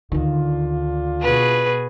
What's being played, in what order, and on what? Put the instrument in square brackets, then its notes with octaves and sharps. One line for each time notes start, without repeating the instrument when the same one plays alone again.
[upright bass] D2 D#3 [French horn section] D3 D4 F4
[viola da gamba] B2 F#4 G#4 [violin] B4